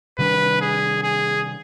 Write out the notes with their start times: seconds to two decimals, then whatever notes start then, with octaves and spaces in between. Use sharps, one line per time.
0.18 C3 D#3 G3 D4 B4
0.61 G#4
1.03 G#4